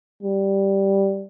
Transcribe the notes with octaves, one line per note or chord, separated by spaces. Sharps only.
G3